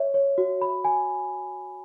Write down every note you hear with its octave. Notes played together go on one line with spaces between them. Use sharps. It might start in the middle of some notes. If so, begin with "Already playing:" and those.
Already playing: C#5 E5
C#5
F#4
B5
G#5